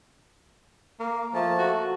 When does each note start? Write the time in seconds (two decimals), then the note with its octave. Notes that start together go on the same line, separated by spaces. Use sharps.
1.00 A#3 A#4
1.34 F3 A3 A#3 A5
1.58 F#4